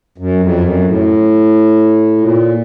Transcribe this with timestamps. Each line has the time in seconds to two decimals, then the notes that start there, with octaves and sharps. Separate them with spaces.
0.18 F#2
0.40 F2
0.62 F#2
0.85 A2
2.18 A#2